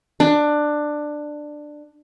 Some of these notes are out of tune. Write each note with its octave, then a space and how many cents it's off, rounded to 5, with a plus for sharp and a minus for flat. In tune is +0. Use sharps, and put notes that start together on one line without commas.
D4 +15